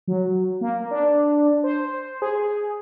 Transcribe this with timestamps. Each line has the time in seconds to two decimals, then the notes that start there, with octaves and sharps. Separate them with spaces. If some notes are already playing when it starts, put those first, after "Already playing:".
0.08 F#3
0.61 A#3
0.91 D4
1.64 C5
2.22 G#4